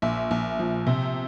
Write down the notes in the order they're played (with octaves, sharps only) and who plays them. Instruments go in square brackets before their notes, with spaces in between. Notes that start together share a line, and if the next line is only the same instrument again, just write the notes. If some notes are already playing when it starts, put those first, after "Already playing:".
[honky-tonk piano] A#1 E5
A#1
F3
C3